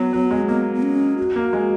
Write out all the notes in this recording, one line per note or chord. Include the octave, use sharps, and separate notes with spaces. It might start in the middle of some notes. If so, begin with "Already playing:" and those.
Already playing: F#3 B3
F#3
G#3
A#3 B3
B3
C#4
F#4
A#3
G#3